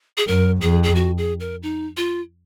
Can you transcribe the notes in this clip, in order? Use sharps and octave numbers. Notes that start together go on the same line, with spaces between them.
G#4
F#2 A#4
F2 G#4
G#4
F#4
G#4
A#4
D#4
F4